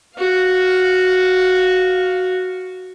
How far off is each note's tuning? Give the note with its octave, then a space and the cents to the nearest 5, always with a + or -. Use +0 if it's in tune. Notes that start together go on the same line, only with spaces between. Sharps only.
F#4 +0 F5 +10